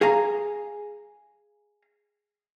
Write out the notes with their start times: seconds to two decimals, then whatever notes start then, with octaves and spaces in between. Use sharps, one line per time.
0.01 G#4 F5 G#5 A#5